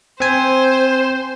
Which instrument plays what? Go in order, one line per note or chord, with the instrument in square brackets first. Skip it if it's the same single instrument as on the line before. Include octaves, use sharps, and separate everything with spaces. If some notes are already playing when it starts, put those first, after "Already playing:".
[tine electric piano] C4 G#5 [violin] C5